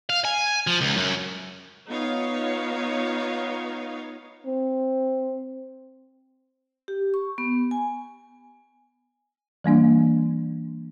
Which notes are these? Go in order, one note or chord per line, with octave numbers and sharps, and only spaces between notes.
F5
G#5
F3
C#2
F#2
B3 D#4 F4 C#5 F5
C4
G4
C#6
B3
G#5
E3 G3 A#3 D4